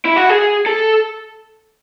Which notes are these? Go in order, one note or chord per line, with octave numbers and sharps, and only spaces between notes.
E4
F#4
G#4
A4